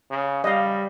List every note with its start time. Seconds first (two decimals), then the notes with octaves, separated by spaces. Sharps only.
0.11 C#3
0.44 G3 D#5 F5